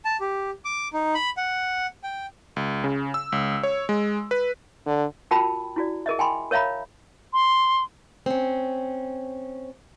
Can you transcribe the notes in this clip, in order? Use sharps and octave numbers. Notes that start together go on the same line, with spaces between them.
A5
G4
D6
D#4
B5
F#5
G5
C#2
C#3
E6
C#2
C#5
G#3
B4
D3
F4 F#4 A#4 G5 A5 B5
E4 F#4 D5
G#4 A#4 D#5 E5
G5 G#5 B5 C6
A#4 C#5 E5 F5 A#5 B5
C6
C4 C#4